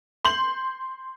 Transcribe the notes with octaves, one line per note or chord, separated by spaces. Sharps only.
C6 G6 F#7